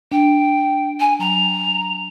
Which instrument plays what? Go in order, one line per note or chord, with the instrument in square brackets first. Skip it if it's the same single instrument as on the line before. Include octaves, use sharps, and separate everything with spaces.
[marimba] D4 [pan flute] G5
[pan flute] G#5
[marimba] F#3 [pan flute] A#5